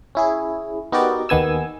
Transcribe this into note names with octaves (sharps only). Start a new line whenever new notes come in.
C#4 E4 G#4
B3 D#4 F#4 G4 A#4 D5
D#2 D#3 B3 G#5 E6